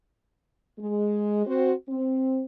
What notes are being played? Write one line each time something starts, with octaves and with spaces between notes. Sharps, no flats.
G#3
C4 F#4 C5
C4